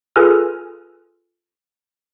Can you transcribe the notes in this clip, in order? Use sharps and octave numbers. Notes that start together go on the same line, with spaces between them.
F4 G#4 A4 B4 G#5 F6